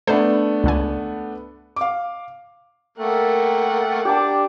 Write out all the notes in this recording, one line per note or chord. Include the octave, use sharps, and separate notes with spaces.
A3 B3 D4 C5
C#2 D3 G#5
F5 D6
A3 A#3 A#4 F#5 G5
D4 G4 A5 D6